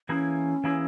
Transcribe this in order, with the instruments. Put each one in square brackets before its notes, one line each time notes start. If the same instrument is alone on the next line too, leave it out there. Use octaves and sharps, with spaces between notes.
[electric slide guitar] E3 A#3 E4 G#4 [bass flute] C#4
[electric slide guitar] E3 A#3 E4 G#4